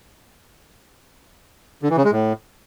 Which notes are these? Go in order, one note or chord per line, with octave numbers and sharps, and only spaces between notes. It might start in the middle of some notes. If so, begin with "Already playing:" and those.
D3
E3
C#3
G#3
A2